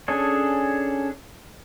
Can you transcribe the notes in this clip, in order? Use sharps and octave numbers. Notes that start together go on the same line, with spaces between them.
C#4 D4 G#4 A4 C#5